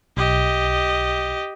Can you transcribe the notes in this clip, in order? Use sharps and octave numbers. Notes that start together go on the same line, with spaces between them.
B1 G4 D#5